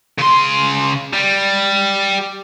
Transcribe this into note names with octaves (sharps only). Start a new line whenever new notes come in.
C#3 C6
G3